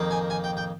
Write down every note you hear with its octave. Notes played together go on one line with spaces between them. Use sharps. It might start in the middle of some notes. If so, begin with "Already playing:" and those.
Already playing: F2 D#3 A#3
G#5
G#5
G5
G5